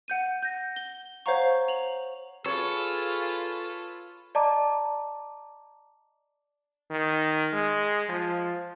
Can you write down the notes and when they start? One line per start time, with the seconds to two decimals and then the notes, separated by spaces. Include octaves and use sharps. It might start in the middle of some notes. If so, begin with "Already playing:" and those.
0.08 F#5 G6 D#7
0.42 G6 A#6
0.76 G7
1.26 C5 C#5 F5 F#5 A#5 C#6
1.68 F7 F#7
2.46 F4 G#4 A4 B4 C#5
4.35 D5 D#5 A5 A#5 D6
6.91 D#3
7.53 G#3
8.09 F3